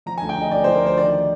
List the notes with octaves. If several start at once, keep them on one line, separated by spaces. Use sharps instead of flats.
F3 A#5
G#5
D2
G5
D2 D#5
D2 D5
C5
F3
A#4
D2 C5
D#3 D5